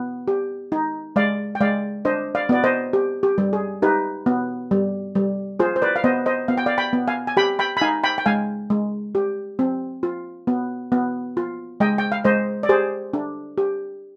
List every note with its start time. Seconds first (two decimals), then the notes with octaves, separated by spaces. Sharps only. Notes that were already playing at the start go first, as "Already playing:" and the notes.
Already playing: B3
0.28 G4
0.72 D#4
1.16 G#3 D5 F5
1.55 G5
1.60 G#3 D5 F5
2.05 D4 C5 D#5
2.35 D5 F5
2.49 B3 D5
2.64 C5 D#5
2.93 G4
3.23 G4
3.38 G3
3.53 G#4
3.82 D#4 G4 B4
4.26 B3
4.71 G3
5.15 G3
5.59 F4 G#4 C5
5.76 C5
5.82 B4 D5
5.96 F5
6.04 B3 C5 D#5
6.26 C5 D#5
6.48 B3 F5
6.58 G5
6.66 D5 F5
6.78 G5 B5
6.93 B3
7.08 F5 G#5
7.27 G#5
7.37 G4 G5 B5
7.59 G5 B5
7.77 B5
7.81 D#4 F5 G#5
8.04 G5 B5
8.18 G5
8.26 G#3 F5 G#5
8.70 G#3
9.15 G4
9.59 C4
10.03 F4
10.47 B3
10.92 B3
11.37 F4
11.80 G#3 D#5 G5
11.98 G5
12.12 F5
12.25 G#3 C5 D#5
12.63 D5
12.69 G4 G#4 C5
13.13 D4
13.58 G4